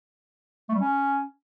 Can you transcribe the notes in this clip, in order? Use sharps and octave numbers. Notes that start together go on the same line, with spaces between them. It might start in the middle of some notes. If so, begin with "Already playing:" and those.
A3
G3
C#4